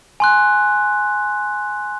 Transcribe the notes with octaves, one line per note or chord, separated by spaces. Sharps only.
G#5 C6 F#6